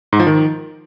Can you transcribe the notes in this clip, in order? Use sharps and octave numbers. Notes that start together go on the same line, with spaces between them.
G#2
F3
D#3